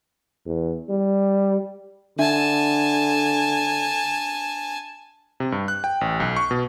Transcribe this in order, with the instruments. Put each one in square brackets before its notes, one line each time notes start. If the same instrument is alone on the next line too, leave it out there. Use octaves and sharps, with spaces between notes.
[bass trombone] E2
G3
[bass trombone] D3 [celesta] D4 E5 [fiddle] G#5 A5
[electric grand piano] C3
G2
F#6
G5
A1
B1
C#6
B2